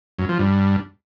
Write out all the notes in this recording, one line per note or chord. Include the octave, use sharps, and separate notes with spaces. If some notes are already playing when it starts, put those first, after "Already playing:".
F#2
F3
G2